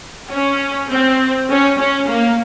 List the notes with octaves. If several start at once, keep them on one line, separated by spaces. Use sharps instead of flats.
C#4
C4
C#4
C#4
A#3